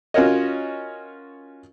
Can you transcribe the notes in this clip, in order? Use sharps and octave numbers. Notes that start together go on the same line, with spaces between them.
C#4 F4 F#4 A#4 C#5 D#5